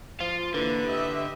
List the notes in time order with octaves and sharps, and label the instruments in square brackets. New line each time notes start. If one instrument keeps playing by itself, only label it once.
[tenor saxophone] F3 [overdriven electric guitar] F4 F5
[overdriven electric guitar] D3 [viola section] E3 A#3 [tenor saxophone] B4
[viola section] G4 D#5 E5